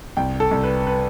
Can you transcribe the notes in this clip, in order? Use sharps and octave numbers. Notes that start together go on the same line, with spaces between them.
C2 G5
A4
C2
B4
B4